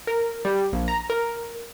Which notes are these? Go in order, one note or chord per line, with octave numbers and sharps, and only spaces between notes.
A#4
G3
A#1
A#5
A#4